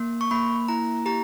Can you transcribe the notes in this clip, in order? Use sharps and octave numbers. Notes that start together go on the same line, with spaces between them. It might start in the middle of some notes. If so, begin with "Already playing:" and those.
Already playing: A#3
C#6
A#3 B5
E4 A#5
G4 A#5